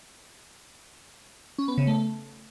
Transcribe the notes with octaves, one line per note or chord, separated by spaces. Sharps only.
C#4
B3
C#3
A3